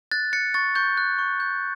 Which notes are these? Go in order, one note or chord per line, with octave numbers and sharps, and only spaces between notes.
F#6 A6
F#6 A6 C#7
C#6 A6
C#6 G6
F#6
C#6
G6